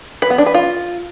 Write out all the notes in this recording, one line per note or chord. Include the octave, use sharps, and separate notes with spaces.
B4
B3
D4
B4
F4